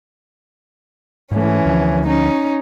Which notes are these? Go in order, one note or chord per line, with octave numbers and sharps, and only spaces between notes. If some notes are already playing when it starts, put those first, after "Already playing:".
G#2 E3 A3 C#4
D2 D3 F3
C#4 D#4